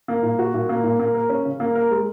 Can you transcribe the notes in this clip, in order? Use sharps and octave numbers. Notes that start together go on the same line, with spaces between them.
A#3
A#2
F#4
A#2
A#3
A#2
A#3
A#4
C#4
C#3
A#3
A#4
G#3